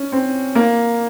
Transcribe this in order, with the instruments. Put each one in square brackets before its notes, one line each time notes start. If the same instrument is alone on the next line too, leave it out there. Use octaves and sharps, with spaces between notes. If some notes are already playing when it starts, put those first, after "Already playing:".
Already playing: [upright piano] C#4
C4
A#3